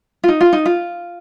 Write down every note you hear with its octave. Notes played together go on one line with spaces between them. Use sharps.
F4
D#4
F4
D#4
F4